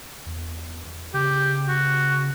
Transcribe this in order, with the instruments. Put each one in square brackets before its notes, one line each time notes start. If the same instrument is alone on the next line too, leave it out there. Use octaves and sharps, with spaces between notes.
[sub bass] E2
[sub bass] C#3 [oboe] G4
[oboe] F#4